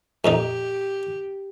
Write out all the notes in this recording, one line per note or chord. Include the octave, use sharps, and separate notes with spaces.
F2 A#2 D#4 G4